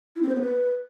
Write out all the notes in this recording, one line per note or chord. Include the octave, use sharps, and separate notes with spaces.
E4
C4
C5
B3
B4